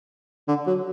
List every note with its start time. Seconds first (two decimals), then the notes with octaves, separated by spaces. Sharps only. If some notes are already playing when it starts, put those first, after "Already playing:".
0.48 D3
0.67 F#3